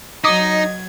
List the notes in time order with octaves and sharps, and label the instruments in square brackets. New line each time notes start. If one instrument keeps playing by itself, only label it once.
[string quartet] F#3 G#6 [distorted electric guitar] D#4 [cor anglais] D#5 [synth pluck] D6 D#6 B6